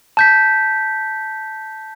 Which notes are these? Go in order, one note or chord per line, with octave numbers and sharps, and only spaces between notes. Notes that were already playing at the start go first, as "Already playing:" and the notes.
A5 G6 B6